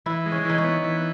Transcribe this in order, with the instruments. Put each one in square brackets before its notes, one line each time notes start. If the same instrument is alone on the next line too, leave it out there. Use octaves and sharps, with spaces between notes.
[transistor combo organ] E3 [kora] E4
[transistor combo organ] G#3
[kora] C#4
[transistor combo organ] E3 [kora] D#4
[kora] C#4
[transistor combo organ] B3
E3